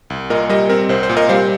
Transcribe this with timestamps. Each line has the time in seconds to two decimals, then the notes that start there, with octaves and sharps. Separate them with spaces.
0.10 C2
0.30 A#2 A#4 D#5
0.49 G3 A#4 D#5
0.69 C4 A#4
0.89 C2 C5
1.03 C5
1.09 A#2
1.17 A#4 D#5
1.29 G3 C5 F5